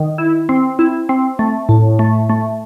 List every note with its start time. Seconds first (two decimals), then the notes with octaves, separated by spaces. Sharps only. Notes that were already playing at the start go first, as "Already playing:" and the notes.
Already playing: D#3
0.18 E4
0.49 C4
0.79 E4
1.09 C4
1.39 A3
1.69 A2
1.99 A3
2.30 A3